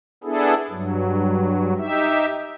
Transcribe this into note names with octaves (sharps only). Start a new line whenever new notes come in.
B3 D4 E4 G#4 A4
G2 F#3
D#4 G4 E5